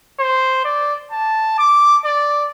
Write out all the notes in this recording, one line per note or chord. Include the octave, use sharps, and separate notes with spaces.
C5
D5
A5
D6
D5